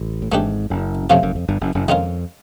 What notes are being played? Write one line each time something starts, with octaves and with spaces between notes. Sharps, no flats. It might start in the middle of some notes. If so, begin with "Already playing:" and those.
Already playing: A1
A2
G#1 G#2 E3 A3 D4 G4
F#1 F#2
F2 C3 F3 A3 C#4 F4
F#1 F#2
F2
G1 G2
F#1 F#2
F#1 F#2
F2 D#3 G#3 C#4 F4 A#4